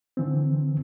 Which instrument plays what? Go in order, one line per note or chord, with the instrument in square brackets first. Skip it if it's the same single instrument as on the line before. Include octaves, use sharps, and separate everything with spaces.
[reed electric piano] D3 E3 C4